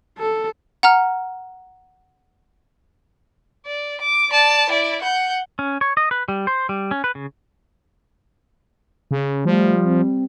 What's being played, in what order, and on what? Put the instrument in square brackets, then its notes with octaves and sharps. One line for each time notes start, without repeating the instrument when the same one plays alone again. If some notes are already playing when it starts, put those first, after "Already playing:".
[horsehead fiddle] A4
[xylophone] F#5 A#5 F6
[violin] D5
D6
D5 A5
E4 D5
F#5 G6
[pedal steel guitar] C#4
C#5
D#5
B4
G3
C5
G3
C#4
B4
C#3
[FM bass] C#3
[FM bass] F3 [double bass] G3 [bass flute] A3
[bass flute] C4